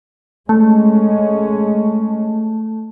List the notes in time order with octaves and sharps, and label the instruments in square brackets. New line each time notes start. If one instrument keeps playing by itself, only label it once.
[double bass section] G#3 C#4 [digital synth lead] A3